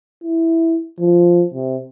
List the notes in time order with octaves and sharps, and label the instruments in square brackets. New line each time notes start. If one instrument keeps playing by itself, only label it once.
[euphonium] E4
F3
C3